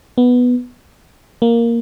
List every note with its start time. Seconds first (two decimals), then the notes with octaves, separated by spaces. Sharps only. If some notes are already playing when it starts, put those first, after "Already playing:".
0.18 B3
1.42 A#3